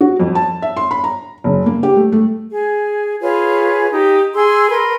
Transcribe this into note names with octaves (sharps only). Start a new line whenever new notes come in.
F#4
F2
A5
E5
C6
B5
A#5
F#1
A#3
G4
A3
A3
G#4
F4 G#4 B4 C#5
D#4 G4
G#4 C6 E6
A#4 B4 B5 C6